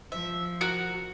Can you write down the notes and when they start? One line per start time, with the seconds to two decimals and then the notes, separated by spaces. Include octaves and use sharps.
0.12 F3 E5
0.61 F#4 A#4 C#7